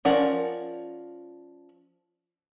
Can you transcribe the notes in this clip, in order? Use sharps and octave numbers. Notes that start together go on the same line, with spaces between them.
F3 C#4 A#4 D5 F#5